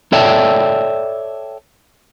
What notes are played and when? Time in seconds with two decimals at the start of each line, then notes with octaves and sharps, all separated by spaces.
0.12 A4 C#5 D5 E5 G5 A5